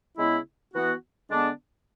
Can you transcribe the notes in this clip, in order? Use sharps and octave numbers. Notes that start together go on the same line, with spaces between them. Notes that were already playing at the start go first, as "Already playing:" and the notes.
C#3 G#3 B3 E4
E3 B3 F#4
D3 G#3 B3 D4